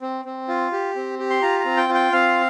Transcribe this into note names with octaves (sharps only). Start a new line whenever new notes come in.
C4
C4
F4
G4
C4
G4
C6
F4 A#5
A#5
C4
G5
F4
G5
C4 F5